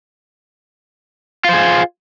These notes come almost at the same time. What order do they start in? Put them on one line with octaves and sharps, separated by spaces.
F4 C5 G#4